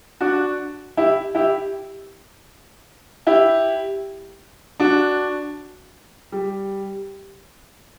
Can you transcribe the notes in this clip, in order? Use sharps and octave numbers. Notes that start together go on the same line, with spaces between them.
D4 F#4
E4 G4
E4 G4
E4 G4
D4 F#4
G3